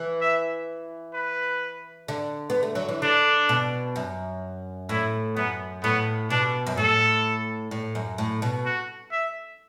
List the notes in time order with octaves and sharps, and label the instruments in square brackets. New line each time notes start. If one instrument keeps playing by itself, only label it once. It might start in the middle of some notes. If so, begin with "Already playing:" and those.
Already playing: [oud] E3
[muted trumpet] E5
B4
[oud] D3
B3
A3
F#3
E3
[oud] D3 [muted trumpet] D4
[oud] B2
F#2
[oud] A2 [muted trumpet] E4
[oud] F#2 [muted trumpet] B3
[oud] A2 [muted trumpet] B3
[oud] B2 [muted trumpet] D4
[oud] F#2
[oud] A2 [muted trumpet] A4
[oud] A2
F#2
A2
B2
[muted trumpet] F#4
E5